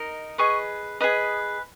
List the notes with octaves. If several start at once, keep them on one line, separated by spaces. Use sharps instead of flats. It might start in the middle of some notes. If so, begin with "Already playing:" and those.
Already playing: D#4 A#4 D#5
G#4 B4 D#5 C#6
G#4 B4 D#5 D#6